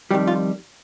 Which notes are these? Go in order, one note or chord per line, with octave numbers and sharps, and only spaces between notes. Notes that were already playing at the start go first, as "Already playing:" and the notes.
F2 D#3 G3 G4
F4